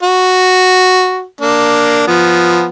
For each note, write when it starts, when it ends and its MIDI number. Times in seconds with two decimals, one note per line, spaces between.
0.03 1.25 66
1.41 2.05 58
1.41 2.05 62
2.07 2.69 53
2.07 2.69 59